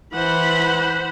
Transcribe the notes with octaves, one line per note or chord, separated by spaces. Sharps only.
E3 C5 F#5 B5